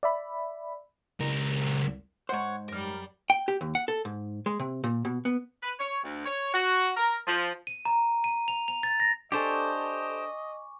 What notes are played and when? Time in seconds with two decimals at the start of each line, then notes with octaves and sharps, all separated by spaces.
0.03 D5 E5 B5
1.20 C#2 A#4
2.29 G#2 C5 C#5 F#5
2.68 F#2 G3 A#4 F6
3.30 G5
3.48 G4
3.61 D#2
3.75 F#5
3.88 A4
4.05 G#2
4.46 G#3
4.60 C3
4.84 A#2
5.05 B2
5.25 B3
5.63 B4
5.79 C#5
6.03 D2
6.25 C#5
6.54 F#4
6.97 A#4
7.27 F3
7.67 D#7
7.85 A#5
8.24 D#7
8.48 F7
8.68 F7
8.83 A6
9.00 A#6
9.32 D4 G4 A4 C5 D#5 G#5 C#6 D6